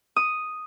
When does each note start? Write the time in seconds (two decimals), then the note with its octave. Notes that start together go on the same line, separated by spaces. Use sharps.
0.16 D#6